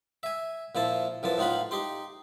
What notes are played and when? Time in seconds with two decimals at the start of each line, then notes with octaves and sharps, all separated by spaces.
0.23 E5 G#5
0.75 A#2 F3 E4 A5
1.23 F#2 E3 F3 A5
1.38 A2 D#4 F4 F#5 B5
1.71 D#4 G4 C6